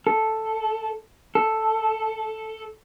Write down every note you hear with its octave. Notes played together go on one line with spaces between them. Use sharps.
A4
A4